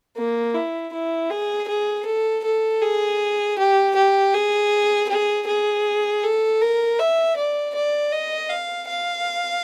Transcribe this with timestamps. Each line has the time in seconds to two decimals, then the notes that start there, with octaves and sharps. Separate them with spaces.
0.17 A#3
0.55 E4
0.93 E4
1.30 G#4
1.68 G#4
2.06 A4
2.44 A4
2.82 G#4
3.59 G4
3.96 G4
4.34 G#4
5.09 G#4
5.47 G#4
6.24 A4
6.62 A#4
6.99 E5
7.37 D5
7.75 D5
8.13 D#5
8.50 F5
8.88 F5